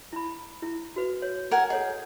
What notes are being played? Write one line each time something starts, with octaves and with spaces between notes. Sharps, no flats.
E4 B5
E4
F#4 B4
C#5
A#4 F#5 G#5
G#4 A4 C#5 D#5